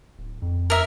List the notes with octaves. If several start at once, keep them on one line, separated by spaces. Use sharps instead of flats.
D1
F2
A#4 E5